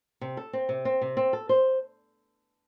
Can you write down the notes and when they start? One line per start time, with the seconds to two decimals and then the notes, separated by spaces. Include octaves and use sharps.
0.21 C3
0.37 A4
0.53 C4
0.69 C3
0.85 C4
1.02 C3
1.17 C4
1.33 A4
1.49 C5